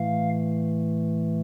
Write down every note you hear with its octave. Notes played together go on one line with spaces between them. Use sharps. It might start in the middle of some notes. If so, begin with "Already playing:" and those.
Already playing: A2 E3 A3 F5